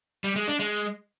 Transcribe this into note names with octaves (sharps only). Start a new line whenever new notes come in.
G3
G#3
D4
G#3